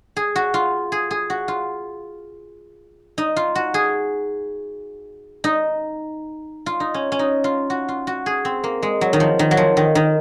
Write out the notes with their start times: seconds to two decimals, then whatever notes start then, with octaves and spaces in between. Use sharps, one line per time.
0.16 G#4
0.36 F#4
0.54 F4
0.92 G#4
1.11 G#4
1.30 F#4
1.48 F4
3.18 D#4
3.37 F4
3.55 F#4
3.74 G#4
5.44 D#4
6.66 F4
6.80 D#4
6.94 C#4
7.12 C#4
7.19 D#4
7.44 F4
7.70 F#4
7.88 F4
8.07 F#4
8.26 G#4
8.45 C4
8.64 A#3
8.83 G#3
9.01 F#3
9.13 D#3
9.20 F3
9.39 D#3
9.51 F#3
9.57 F3
9.77 D#3
9.95 D#3